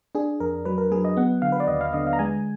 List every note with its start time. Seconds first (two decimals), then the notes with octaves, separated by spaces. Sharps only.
0.15 D4 G#4
0.40 F2 A#4
0.65 F#3 B4
0.78 A#4
0.92 F#3 G#4
1.05 D#5
1.17 B3 F#5
1.42 D3 F5
1.52 B4
1.60 D5
1.67 D#2 D#5
1.81 F5
1.93 D3 D#5
2.07 F5
2.13 A#5
2.19 G#3 G#5